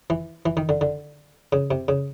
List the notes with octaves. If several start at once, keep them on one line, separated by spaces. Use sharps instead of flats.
E3
E3
D#3
D3
D3
C#3
C3
C#3